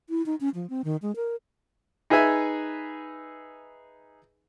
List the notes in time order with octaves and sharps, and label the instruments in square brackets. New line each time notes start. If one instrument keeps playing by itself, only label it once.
[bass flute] E4
D#4
C#4
F3
C4
D#3
G#3
A#4
[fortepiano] D#4 G#4 B4 E5 G#5